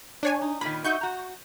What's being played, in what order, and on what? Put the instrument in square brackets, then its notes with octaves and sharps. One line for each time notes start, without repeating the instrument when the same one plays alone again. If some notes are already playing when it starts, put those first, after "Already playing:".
[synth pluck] D4 C#5 G#5
[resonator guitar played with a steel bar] D#4
[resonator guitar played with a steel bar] A#2 D#3 [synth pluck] B5
[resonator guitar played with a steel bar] D#4 F#4 E5 [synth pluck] C#6 G6
[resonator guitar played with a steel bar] F#4 A#5